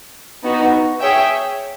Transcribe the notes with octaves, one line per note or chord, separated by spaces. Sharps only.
B3 D#4 F#4
G#4 C#5 E5 G5